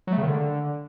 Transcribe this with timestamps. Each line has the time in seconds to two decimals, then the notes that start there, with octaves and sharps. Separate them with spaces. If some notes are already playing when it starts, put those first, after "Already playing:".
0.07 F#3
0.13 A3
0.18 C#3
0.23 D#3
0.28 D3